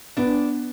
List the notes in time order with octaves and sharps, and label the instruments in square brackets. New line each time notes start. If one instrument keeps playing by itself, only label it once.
[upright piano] B3 [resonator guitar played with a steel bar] D4